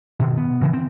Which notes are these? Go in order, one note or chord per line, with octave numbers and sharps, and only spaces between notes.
B2 D#3
B3
D2 C#3 E3
C4